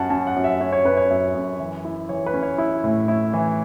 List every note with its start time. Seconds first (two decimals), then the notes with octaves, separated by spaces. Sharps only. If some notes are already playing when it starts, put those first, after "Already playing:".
Already playing: F#2 C#4 F#5 A5
0.10 C#4 A5
0.27 F#5
0.36 F#2
0.44 E5
0.61 C#4 C#5
0.72 C#5
0.85 F#2 B4
0.97 C#5
1.10 F#2 E5
1.35 F#2
1.60 E3
1.85 E4
2.09 E3 C#5
2.26 B4
2.34 C#4
2.43 C#5
2.58 E4
2.84 A2
3.08 E4
3.34 E3